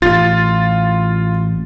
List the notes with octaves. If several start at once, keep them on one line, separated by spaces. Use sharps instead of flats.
A1 F4 A6